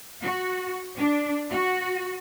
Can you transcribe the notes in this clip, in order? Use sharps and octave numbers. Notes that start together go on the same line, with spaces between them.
F#4
D4
F#4